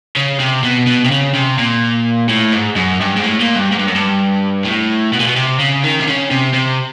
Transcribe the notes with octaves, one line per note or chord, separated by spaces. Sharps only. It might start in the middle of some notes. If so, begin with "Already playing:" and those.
C#3
C3
B2
B2
C3
C#3
C3
A#2
A2
G#2
F#2
G2
G#2
A2
A#2
G2
G#2
G2
F#2
G2
A2
B2
A#2
B2
C3
C#3
D#3
C3
C#3
C3
C3